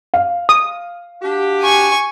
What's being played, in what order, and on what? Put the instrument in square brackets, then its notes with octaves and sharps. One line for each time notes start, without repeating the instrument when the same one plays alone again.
[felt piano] F5
[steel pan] D#6
[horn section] D4 F#4 G4
[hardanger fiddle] G#5 C#6